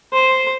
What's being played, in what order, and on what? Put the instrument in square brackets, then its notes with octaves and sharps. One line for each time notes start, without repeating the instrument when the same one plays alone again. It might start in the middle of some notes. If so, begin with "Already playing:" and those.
[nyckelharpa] C5